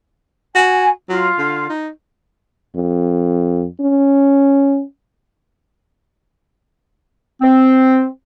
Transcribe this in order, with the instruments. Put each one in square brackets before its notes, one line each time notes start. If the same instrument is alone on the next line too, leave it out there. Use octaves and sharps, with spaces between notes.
[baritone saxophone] F#4 [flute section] G#5
[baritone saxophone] F#3 [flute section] F4
[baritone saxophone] D3
D#4
[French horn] F2
C#4
[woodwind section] C4